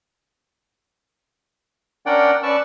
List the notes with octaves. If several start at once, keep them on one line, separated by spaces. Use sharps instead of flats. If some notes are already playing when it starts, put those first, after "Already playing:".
C#4 D4 A#4 D5 F#5 G5
C#4 B4 D5 A5 C#6 E6